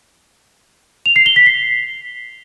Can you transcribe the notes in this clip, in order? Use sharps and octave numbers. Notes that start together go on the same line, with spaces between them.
F7
C7
G7
B6
C7